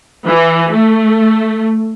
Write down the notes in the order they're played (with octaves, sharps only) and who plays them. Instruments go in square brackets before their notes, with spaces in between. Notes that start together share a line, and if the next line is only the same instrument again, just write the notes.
[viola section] E3
A3